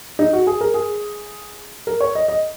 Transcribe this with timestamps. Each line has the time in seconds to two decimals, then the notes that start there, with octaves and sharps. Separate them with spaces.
0.19 D#4
0.33 F#4
0.47 G#4
0.61 A#4
0.74 G#4
1.87 A#4
2.01 C#5
2.15 D#5
2.28 D#5